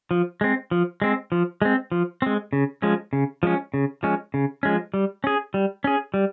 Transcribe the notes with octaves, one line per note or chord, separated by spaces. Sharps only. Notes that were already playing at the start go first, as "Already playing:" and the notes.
F3
G#3 C4
F3
G#3 C4
F3
G#3 C4
F3
G#3 C4
C#3
F3 G#3 C#4
C#3
F3 G#3 C#4
C#3
F3 G#3 C#4
C#3
F3 G#3 C#4
G3
C#4 G#4
G3
C#4 G#4
G3